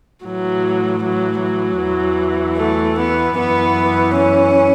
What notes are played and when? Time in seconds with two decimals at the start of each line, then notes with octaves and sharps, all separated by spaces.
0.24 A2 E3 F#3
1.03 F#3
1.41 F#3
1.80 E2 E3
2.58 A3
2.97 B3
3.36 F#2 E3 B3
4.14 C#4